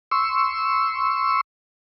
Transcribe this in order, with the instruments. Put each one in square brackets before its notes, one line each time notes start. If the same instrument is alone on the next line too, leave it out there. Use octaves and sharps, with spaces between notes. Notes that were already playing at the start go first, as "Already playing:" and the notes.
[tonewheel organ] C6 C#6 E6